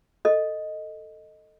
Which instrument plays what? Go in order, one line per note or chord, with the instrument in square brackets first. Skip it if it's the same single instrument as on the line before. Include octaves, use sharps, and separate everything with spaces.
[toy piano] A4 D#5